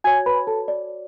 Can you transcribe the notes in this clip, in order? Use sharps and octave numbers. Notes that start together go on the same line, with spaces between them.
F#4 C#5 G#5 G#6
B4 B5
A4 A5
D5